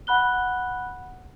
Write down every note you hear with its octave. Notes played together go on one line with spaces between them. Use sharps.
F#5 B5 F#6 G7